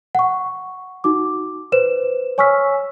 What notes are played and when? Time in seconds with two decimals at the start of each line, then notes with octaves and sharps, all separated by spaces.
0.15 F#5 C#6
1.04 D#4 F#4 D6
1.72 B4 C5 E7
2.38 C#5 G#5 C#6 E6 F6 B6